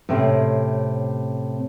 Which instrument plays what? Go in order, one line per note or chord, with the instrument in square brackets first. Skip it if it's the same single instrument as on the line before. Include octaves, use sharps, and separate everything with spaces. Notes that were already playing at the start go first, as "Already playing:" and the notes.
[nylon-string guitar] A2 C3 C4 C#4